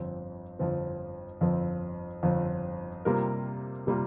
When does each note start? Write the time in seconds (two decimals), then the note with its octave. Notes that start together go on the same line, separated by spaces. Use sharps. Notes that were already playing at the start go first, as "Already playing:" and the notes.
Already playing: G1 F2 F3 C4
0.59 G1 F2 F3 C4
1.41 G1 F2 F3 C4
2.23 G1 F2 F3 C4
3.05 C3 G3 A#3 F4 A#4
3.87 C3 G3 A#3 F4 A#4